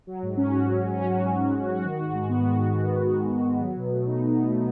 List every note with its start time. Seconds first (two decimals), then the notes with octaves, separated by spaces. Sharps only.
0.07 F#3
0.22 G#2
0.37 C#4
0.51 F#4
0.66 F#3
0.81 G#2
0.95 C#4
1.10 F#4
1.25 F#3
1.41 G#2
1.54 C#4
1.70 F#4
1.84 D#3
2.00 G#2
2.14 G#3
2.29 B3
2.43 D#3
2.58 G#2
2.73 G#3
2.88 B3
3.02 D#3
3.17 G#2
3.32 G#3
3.47 B3
3.61 F#3
3.76 B2
3.91 A3
4.06 D#4
4.20 F#3
4.35 B2
4.50 A3